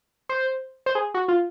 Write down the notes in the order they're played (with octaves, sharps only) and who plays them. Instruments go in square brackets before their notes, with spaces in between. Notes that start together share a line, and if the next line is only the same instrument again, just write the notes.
[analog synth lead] C5
C5
G#4
F#4
F4